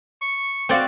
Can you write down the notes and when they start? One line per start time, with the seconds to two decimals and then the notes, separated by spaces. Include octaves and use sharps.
0.21 C#6
0.69 C4 F#4 C5 D5 F5